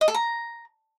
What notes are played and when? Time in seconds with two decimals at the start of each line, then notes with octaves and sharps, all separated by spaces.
0.01 D#5
0.08 A4
0.14 A#5